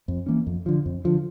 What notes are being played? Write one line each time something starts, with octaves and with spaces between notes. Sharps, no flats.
F2
E3 A#3 C#4
F2
D3 F3
F2
D3 F3